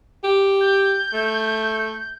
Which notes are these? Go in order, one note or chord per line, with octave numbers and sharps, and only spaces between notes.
G4
G6
A3